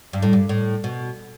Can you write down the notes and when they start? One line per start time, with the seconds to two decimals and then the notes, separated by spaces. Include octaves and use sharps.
0.13 G2
0.22 A2
0.33 G2
0.49 A2
0.84 B2